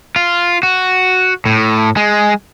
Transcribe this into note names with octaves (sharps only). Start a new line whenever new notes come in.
F4
F#4
A2
G#3